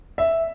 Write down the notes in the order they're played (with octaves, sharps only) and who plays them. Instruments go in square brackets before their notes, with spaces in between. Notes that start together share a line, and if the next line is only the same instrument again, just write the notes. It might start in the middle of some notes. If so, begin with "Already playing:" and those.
[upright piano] E5